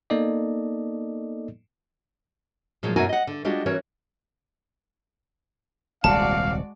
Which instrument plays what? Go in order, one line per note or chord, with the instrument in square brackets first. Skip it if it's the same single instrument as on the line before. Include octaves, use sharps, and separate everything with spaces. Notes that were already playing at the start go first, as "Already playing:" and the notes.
[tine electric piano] A#3 B3 D#4 A4 D5 D#5
[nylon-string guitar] A#2 F3 F#3 G#3
F#2 B2 E4 F#4 A#4 G#5
D#5 F#5
D3
G3 G#3 D4 F4 F#4 D#5
E3 C#4 F#4 A#4 C#5
[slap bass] D#1 C2 C3 [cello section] G#3 F#4 D5 [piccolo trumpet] F5 [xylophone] A5